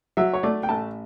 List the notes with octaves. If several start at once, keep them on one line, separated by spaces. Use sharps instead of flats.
F#3 E5
C#5
A3 D5
G5
A1 A5